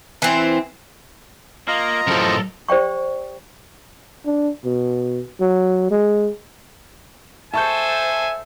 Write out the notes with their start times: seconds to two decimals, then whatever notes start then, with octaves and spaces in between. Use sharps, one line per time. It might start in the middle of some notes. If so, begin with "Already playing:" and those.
0.22 E3 C4
1.68 A#3 F4 D#5 A#5
2.07 F#2 A2 F3 A4 A#4
2.68 G4 C5 D5 G5 C#6
4.26 D4
4.65 B2
5.41 F#3
5.91 G#3
7.54 A4 C5 E5 G#5 A5 C#6 G6